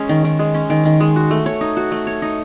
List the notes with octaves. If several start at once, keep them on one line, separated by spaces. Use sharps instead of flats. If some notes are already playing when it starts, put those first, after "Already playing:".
Already playing: G#3 C#4
D#3
D#3
G#3
C#4
D#3
D#3
G#3
F#4
A3
C#5
D#4
F#4
A3
C#5
D#4